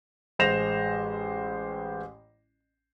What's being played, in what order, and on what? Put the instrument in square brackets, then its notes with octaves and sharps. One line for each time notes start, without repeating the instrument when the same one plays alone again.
[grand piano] A1 G#3 C5 A#6 E7 F7